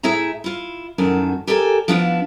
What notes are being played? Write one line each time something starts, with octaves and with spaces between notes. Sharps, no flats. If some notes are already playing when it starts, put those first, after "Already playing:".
A2 E4 G#4 E5 A#5
E4 F4
F#2 A2 D#3 F#4 A5
G4 A4 A#4 D5 F#5 G#5
F3 B3 D4 E4 F4